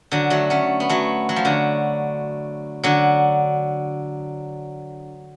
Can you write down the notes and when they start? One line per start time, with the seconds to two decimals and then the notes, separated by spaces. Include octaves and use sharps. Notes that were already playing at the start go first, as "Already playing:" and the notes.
0.12 D3 F#3
0.30 F#3 A3
0.50 A3 C#4
0.80 B3
0.89 F#3 A3
1.29 F#3
1.36 F3
1.45 D3 F#3
2.83 D3 F#3